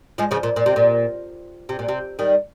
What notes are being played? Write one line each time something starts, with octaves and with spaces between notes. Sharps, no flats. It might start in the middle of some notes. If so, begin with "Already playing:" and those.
F3 G#3
C#3 F3
A#2
A#2
C3
A#2
C3
A#2
C3
D#3 G3